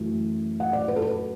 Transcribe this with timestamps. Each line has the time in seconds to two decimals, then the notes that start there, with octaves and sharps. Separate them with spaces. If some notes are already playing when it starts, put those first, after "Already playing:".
Already playing: F#2 E3 A3
0.60 F#5
0.73 D5
0.88 B4
0.96 A4
1.02 B4